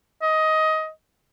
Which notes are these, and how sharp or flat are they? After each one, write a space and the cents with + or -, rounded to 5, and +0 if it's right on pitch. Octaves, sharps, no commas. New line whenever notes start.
D#5 +15